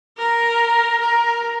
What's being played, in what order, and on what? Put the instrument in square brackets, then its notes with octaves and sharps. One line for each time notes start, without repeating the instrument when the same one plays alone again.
[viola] A#4
A#4